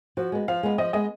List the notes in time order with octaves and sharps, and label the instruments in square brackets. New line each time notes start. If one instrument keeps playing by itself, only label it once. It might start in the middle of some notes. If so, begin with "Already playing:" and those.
[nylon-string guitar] F3 [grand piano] F#4
[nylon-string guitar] G#3 B3
[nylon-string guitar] F3 [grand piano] F5
[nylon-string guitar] G#3 B3
[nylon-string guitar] F3 [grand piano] D#5
[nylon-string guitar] G#3 B3 [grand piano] D#5